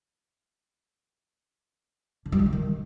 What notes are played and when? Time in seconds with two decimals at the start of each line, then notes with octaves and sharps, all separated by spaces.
2.26 D3
2.32 G3
2.39 C#3
2.46 D3
2.53 D#3